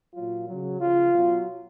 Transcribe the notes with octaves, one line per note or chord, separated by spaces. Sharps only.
A#2 F#3 F4
C#3 F#3
C#3 F3 F4
B2 F#3